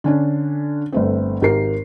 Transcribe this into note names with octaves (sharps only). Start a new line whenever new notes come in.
D3 C#4 D4
G1 A3 C4
G#1 G4 A#4 C7